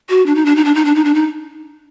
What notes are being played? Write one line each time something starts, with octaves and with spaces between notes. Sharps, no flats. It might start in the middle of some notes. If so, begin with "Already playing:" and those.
F#4
D4
D#4
D4
D#4
D4
D#4
D4
D#4
D4
D#4